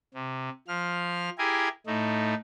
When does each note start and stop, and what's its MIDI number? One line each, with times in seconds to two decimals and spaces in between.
0.14 0.49 48
0.68 1.30 53
0.68 1.30 89
1.38 1.68 64
1.38 1.68 67
1.38 1.68 68
1.38 1.68 70
1.38 1.68 80
1.87 2.35 45
1.87 2.35 57
1.87 2.35 63